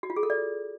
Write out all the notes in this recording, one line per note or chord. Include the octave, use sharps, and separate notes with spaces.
F#4
F4
G#4
A4
D5